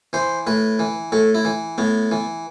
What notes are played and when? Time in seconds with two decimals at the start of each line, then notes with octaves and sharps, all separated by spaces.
0.13 E3 C5
0.47 A2 B4
0.79 E3
1.12 A2 A4
1.35 E4
1.45 E3
1.78 A2 B3
2.11 E3